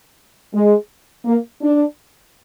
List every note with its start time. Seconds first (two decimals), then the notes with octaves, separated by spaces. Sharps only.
0.53 G#3
1.24 A#3
1.61 D4